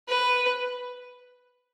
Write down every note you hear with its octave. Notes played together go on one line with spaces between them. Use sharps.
B4